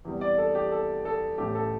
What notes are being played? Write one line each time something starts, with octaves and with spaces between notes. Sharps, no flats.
E2 C3 G3
D5
A4
G4
A4
A4
A1 A2 A3 G4
A4